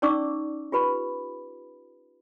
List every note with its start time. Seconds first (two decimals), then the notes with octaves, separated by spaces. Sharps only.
0.02 C#4 D#4 D5 C#6 D6 E6
0.72 F4 G4 B4 B5